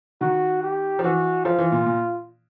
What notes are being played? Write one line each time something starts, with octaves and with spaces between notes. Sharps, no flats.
D#3 F#4
G4
F3
E3 F#4
F3 F4
E3
A#2
A#2